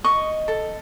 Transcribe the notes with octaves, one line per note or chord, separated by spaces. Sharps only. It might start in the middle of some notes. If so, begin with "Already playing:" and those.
D#5 C#6
A4